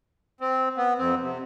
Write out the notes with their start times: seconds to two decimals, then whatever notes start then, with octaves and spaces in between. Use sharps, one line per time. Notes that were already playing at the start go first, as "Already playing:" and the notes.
0.41 C4
0.77 B3
0.98 F2 C4
1.22 C3